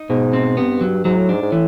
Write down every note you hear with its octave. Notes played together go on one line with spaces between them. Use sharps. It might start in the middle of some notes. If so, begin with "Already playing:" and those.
Already playing: D#4
G#2 B2
C4
G2 B3
F#3
G#2 F#3
A2
G#2 D4
G#2
A2 E3